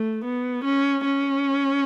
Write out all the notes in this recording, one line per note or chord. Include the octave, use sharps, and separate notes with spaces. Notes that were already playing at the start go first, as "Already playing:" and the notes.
Already playing: A3
B3
C#4
C#4